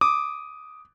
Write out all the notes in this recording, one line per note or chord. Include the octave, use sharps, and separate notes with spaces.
D6 D#6